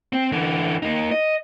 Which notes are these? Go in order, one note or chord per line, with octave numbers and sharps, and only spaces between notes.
C4
D3 E3
A#3 D#4
D#5